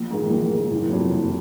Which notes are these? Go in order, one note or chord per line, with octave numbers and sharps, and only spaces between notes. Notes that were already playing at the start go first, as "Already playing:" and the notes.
Already playing: A#1
G#2 D#3 G#3
A#1
G#2 D#3 G#3
F#1
F2 C3 F#3
F#1